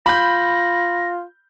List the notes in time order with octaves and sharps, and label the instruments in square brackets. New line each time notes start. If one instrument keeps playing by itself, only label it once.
[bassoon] F4 [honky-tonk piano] B5 G6 [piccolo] A#6